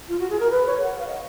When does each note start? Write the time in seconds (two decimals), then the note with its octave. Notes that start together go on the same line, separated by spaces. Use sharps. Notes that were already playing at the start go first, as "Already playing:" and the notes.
0.08 F4
0.19 F#4
0.29 G#4
0.39 A#4
0.50 B4
0.66 C#5
0.82 F#5
0.98 F5
1.06 D#5